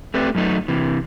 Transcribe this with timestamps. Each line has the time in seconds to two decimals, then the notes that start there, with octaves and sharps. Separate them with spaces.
0.14 A3 C4 G4 B4 D5
0.35 F#2 F#3 A3 D#4
0.68 C3 E3